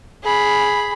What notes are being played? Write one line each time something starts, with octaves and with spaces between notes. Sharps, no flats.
G#4 B5